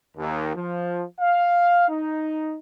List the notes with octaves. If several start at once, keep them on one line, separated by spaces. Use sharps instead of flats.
D#2
F3
F5
D#4